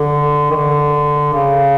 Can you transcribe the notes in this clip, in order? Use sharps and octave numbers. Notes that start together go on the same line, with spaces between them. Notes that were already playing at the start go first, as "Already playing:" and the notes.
Already playing: D3
D#3
D3
C#3